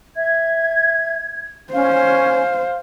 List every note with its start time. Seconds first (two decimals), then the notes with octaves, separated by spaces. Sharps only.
0.16 E5 G#6
1.73 C#4 C5 F5